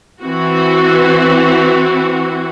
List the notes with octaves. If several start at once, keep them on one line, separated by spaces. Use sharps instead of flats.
E3 C4 F#4